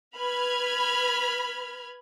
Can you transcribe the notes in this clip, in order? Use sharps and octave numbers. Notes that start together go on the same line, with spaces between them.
B4 B5 F6 G#6